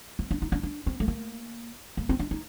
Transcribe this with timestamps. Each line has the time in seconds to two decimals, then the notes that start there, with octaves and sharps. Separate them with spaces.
0.19 C4
0.31 D4
0.42 D#4
0.52 D4
0.63 D4
0.87 C4
1.00 A3
1.08 A#3
1.97 A#3
2.09 C4
2.19 D4
2.31 D#4